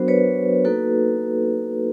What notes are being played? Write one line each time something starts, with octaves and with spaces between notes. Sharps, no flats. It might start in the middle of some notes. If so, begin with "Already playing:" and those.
Already playing: F#3 B3 D4 F#4 A#4 C5
B4 C#5
A#3 D#4 F#4 A4 B4